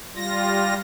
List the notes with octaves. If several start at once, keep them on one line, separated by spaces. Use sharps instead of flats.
G3 F4 A#6